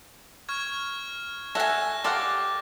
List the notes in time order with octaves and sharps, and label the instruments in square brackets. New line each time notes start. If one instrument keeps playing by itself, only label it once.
[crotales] C#6 F6 G#6
[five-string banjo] A4 F#5 [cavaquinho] E5 G#5 [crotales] F#6 A#6
[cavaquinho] G4 D5 C6 [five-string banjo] A4 F5 F#5